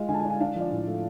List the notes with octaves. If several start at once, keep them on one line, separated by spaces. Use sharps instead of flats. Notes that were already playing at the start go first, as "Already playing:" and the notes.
Already playing: G#3 F4 F5
D3 G#5
A5
G#5
D4
G#5
D4 F5
F3 D5
A2
A3